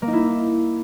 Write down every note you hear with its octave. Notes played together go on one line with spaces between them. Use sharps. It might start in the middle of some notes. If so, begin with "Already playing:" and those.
A#3
D#4
E4